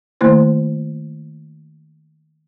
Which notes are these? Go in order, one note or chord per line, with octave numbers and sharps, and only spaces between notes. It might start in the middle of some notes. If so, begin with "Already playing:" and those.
D#3 A3 A#3 E4 C5